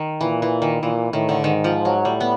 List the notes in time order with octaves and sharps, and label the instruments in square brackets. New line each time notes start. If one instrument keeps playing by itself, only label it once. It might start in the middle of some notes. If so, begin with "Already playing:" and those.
Already playing: [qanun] D#3
[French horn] A#2 [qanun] E3
[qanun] E3
D#3
[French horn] A#2 [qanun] E3
[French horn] A2 [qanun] D#3
[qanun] D3
[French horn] G#2 [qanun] D#3
[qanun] F3
F#3
[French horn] A2 [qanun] G3
[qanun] B3